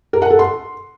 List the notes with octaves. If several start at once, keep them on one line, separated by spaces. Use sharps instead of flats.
A#4
F#5
A4
C6